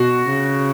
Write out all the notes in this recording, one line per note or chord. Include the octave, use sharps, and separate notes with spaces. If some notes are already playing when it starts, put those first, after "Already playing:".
Already playing: B2 F#4
C#3